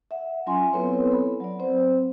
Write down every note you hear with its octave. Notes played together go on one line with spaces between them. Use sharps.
E5 F#5
F#3 C#4 F4 G#5 C6
B3 C4 E4 A4 B4 C#5
B5
F#3 D5
C4 C5